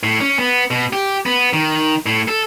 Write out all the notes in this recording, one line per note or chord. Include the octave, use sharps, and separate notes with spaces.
A2
C#4
B3
B2
G4
B3
D#3
A2
A4